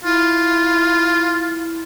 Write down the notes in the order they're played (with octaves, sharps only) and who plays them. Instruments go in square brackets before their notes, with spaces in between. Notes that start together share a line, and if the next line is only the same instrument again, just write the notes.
[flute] E4 [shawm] F4